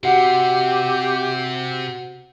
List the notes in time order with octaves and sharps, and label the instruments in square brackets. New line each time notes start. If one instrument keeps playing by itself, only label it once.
[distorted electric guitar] C3 [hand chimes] F#4 F#5 [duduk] G4